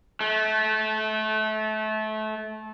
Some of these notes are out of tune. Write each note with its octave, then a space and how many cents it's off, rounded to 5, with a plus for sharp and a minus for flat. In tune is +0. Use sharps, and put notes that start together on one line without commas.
A3 -25